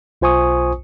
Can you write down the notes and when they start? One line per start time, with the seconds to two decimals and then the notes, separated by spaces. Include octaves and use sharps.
0.22 B1 F4 C5 G#5 C#6 D#6